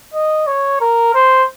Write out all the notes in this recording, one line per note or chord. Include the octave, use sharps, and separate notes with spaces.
D#5
C#5
A#4
C5